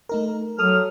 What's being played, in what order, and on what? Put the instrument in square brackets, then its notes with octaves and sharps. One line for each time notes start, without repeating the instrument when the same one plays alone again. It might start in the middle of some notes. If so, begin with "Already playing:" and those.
[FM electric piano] A3 D#4 A#4
[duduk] F#3 [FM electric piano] A4 D#6 [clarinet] F6